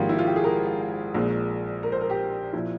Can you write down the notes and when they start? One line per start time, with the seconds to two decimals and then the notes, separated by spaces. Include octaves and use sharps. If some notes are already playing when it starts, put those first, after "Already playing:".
Already playing: G#1 G#2 F3 A#3 F4 G4
0.09 E4
0.18 F4
0.26 G4
0.36 G#4
0.44 A#4
1.14 A#1 A#2 G#3
1.83 A#4
1.92 C5
2.01 A#4
2.10 G4
2.53 A#2 F3 E4